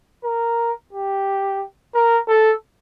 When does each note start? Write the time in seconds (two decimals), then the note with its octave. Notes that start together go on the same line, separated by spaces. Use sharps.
0.24 A#4
0.93 G4
1.95 A#4
2.28 A4